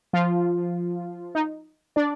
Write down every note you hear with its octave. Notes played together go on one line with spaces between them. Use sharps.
F3 F4
D#4
D4 D5